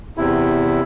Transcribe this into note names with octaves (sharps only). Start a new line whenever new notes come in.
E2 C3 E4